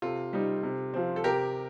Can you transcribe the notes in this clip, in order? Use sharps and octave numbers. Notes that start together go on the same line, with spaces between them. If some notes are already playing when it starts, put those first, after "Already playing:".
C3 F4 A4
G3 C4 D#4
C3
F3 C4
A4
C3 G4 A#4